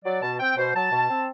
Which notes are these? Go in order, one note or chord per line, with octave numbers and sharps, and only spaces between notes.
F#3 D5
B2 A5
C4 G5
B2 C5
F#3 A5
B2
C4